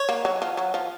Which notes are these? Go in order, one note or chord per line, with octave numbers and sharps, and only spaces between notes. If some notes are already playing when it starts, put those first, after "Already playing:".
Already playing: C#5
A#3
F#3
F3
F#3
F3